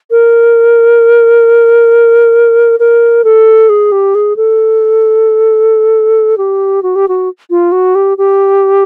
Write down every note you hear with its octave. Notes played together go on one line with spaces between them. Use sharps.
A#4
A#4
A4
G#4
G4
G#4
A4
G4
F#4
G4
F#4
F4
F#4
G4
G4